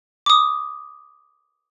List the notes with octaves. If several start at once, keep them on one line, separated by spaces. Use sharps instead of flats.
D6 D#6